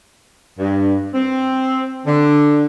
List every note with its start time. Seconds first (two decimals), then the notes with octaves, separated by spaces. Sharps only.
0.59 G2
1.14 C4
2.06 D3